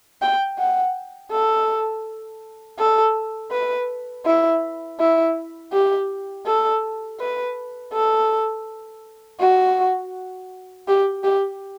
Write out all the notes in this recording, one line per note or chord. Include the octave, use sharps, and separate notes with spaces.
G5
F#5
A4
A4
B4
E4
E4
G4
A4
B4
A4
F#4
G4
G4